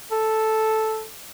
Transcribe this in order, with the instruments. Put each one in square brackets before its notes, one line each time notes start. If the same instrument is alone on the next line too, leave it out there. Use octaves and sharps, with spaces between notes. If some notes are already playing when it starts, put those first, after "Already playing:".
[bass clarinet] A4